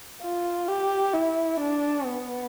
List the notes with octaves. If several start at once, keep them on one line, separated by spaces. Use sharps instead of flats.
F4
G4
E4
D4
B3